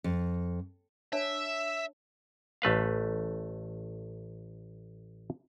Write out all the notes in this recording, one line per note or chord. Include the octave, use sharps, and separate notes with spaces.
F2
D4 C#5 E5 A5
A1 A3 B4 F5